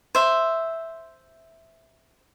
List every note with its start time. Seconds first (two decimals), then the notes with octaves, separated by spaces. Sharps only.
0.15 C5 E5